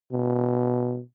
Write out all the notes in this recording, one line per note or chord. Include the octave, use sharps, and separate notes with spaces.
B2